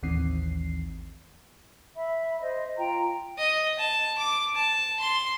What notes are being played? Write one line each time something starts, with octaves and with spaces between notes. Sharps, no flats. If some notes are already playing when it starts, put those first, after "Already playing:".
A1 D#2 D#3 E3 C4 C7
E5 B5
C5 D#5
F4 G5 A#5
D#5
A5
D6
A5
C6